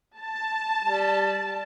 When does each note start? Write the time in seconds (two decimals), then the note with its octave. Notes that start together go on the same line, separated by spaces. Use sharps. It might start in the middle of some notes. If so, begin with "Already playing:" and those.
0.19 A5
0.83 G3